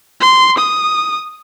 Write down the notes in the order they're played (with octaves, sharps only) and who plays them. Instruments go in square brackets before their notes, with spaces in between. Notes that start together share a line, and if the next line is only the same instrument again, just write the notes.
[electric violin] C6
D#6